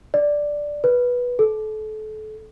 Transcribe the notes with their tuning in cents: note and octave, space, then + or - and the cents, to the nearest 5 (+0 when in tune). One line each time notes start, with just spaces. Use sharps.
D5 +0
B4 -10
A4 -30